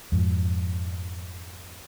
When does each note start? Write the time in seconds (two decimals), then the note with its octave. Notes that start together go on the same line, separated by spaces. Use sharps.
0.12 F2 G#2 F3